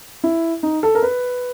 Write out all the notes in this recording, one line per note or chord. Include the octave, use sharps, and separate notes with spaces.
E4
D#4
A4
A#4
B4